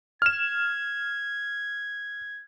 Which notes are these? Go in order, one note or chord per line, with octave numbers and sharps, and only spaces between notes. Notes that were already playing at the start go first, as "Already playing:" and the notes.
F6 G#6 E7